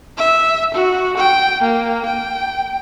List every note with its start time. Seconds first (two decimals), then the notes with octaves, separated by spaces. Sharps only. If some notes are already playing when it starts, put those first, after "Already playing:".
0.18 E5
0.74 F#4
1.17 G5
1.63 A#3
2.06 G5